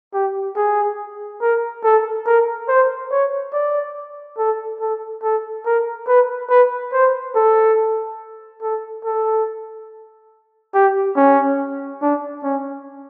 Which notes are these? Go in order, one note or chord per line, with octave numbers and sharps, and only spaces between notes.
G4
G#4
A#4
A4
A#4
C5
C#5
D5
A4
A4
A4
A#4
B4
B4
C5
A4
A4
A4
G4
C#4
D4
C#4